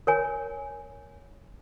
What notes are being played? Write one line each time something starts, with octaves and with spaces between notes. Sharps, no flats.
A#4 C#5 G#5